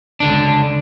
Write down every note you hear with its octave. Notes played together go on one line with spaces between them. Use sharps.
C#2 D3 D4